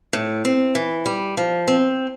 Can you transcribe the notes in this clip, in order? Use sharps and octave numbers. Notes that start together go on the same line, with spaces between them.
A2
C4
E3
G3
F3
C4